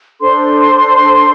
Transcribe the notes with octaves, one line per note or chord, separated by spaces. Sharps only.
D4 A4 C5 C6